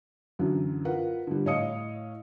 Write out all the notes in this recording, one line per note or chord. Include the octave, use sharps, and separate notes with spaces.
F#2 D3 E3 F#3
F4 A#4 B4 F#5
D3 G3
A2 C#5 D#5 F5 D#6 C#7